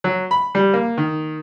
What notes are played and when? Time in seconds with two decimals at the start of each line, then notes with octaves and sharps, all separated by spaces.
0.04 F#3
0.31 B5
0.55 G3
0.74 A#3
0.98 D#3